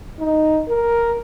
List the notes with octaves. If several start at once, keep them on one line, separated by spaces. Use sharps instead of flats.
D#4
A#4